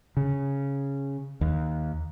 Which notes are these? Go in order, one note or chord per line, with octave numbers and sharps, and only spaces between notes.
C#3
D#2